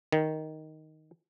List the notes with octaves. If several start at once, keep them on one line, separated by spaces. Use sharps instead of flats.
D#3